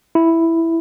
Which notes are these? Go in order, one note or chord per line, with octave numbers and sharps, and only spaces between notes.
E4